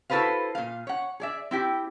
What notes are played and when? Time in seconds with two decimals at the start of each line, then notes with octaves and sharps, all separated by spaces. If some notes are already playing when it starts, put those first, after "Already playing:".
0.10 E4 F#4 A4 B4 C5 F5
0.55 A#2 F5
0.87 C#5 F#5
1.20 G#4 D5 E5
1.51 C4 E4 G4